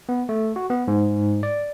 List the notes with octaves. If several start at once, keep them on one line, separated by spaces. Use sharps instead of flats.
B3
A3
F#4
B3
G#2
D5